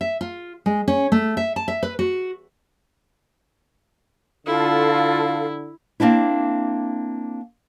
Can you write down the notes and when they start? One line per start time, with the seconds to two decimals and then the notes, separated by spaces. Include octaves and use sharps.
0.01 E5
0.21 F4
0.66 G#3
0.88 C#4
1.12 A3
1.37 E5
1.56 A5
1.68 E5
1.83 B4
1.99 F#4
4.46 D3 E4 F4 A4 F5
6.00 A#3 C4 D4 E4